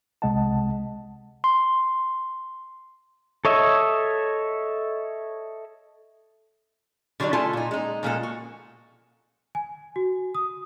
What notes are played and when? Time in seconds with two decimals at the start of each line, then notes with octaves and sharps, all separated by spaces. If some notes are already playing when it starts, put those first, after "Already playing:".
0.22 C2 C3 G#3 D#5 F#5 A5
1.44 C6
3.45 A4 C#5 D#5 E5
7.20 D3 F#3 G3 D4 D#4
7.33 A3 E4 F4 A4 G#5 A5
7.53 A#2 D#4
7.71 G#3 D#4
8.03 A#2 F3 G#3 A#3 E4 A4
8.23 F#4
9.55 G#5
9.96 F#4
10.35 D#6